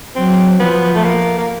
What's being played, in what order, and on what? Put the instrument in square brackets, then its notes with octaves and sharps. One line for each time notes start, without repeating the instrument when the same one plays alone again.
[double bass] F#3 [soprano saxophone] C4
[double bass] F3 [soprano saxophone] B3
[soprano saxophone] A3
A#3
A#3